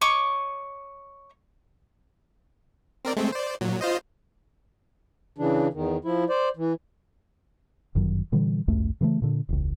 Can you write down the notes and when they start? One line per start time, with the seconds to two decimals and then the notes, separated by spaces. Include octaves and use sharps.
0.01 C#5 D#5 C#6 D6
3.05 C4 A#4 D5
3.16 G#3 A3 C4
3.32 C5 D5
3.61 A#2 F#3
3.81 F4 C5 D#5
5.38 C#3 E3 D4
5.73 E2 D#3
6.05 F3 E4
6.29 C5 D5
6.57 E3
7.95 G1 F#2 D#3 F#3
8.32 A#2 D3 E3 G3
8.68 G#1 C#2 F#2 A3
9.01 C#3 E3 F#3 A3
9.22 A#2 D3
9.49 E1 C#2